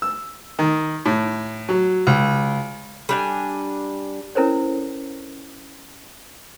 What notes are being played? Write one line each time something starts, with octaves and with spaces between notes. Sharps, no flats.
E6
D#3
A2
F#3
C#2
G3 D4 G#5
C#4 E4 A4 A#4 C5 C#5